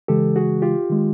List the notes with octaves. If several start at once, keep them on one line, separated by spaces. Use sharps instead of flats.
C#3 E3 G#3 G4 A4
F#4 G#4
F4 G4
D#3 G#3